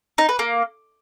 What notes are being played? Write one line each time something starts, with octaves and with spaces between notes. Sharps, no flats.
D#4
B4
A#3